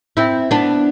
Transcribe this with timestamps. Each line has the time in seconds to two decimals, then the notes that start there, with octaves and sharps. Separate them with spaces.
0.17 C4 E4
0.51 B3 D4